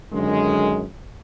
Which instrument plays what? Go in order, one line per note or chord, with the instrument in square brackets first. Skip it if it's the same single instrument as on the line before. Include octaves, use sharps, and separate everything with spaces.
[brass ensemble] F#2 D3 D#3 G#3